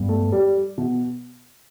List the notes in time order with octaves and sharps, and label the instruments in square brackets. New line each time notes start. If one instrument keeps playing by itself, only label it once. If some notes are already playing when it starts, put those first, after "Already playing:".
Already playing: [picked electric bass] G2 G3 B3
[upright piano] A3
G3
B2